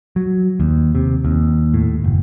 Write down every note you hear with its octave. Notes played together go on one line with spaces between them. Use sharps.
F#3
D#2
C3
D#2
A2
F#1